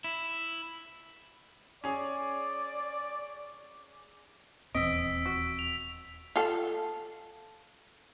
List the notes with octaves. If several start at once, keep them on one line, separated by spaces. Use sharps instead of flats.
E4
C#4 G#4 D5
D#1 E2 C4 D#5 E6 B6 D7
F#4
F7
F4 A4